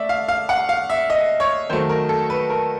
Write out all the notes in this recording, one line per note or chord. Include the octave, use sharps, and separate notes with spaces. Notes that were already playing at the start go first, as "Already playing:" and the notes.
Already playing: A3 D5 E5
F5
F5
F#5
F5
E5
D#5
C#5
D#3 F#3 A3 C5
A#4
A4
B4
A#4